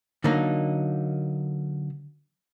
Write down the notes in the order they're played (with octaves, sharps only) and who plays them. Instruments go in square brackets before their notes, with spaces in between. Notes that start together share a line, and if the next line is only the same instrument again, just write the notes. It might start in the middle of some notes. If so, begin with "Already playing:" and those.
[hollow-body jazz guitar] D3 F#3 A#3 D#4